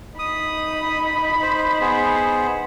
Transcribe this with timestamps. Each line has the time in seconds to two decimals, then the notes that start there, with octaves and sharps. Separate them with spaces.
0.19 D#4 B5 D#6
1.42 C5
1.81 B3 G#4 C5